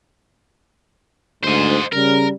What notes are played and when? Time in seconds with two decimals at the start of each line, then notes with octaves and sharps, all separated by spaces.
1.43 D2 G#2 C5 D#5
1.92 C#3 G3 A#4